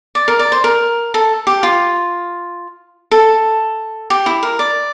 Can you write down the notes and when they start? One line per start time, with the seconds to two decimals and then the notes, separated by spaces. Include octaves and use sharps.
0.15 D5
0.28 A#4
0.39 D5
0.52 C5
0.64 A#4
1.14 A4
1.47 G4
1.63 F4
3.11 A4
4.10 G4
4.26 E4
4.43 A#4
4.59 D5